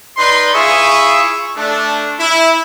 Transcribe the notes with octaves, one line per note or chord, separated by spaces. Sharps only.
D#4 B4 D5 C6
E4 F4 G#4 E5 C#6 D#6
A3 D4
E4